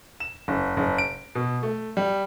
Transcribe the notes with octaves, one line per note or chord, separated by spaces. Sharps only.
E7
F#1
F#1
D7
B2
A3
G3